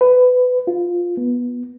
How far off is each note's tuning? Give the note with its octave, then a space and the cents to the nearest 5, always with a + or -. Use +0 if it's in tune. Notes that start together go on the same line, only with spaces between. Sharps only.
B4 +20
F4 +5
B3 -15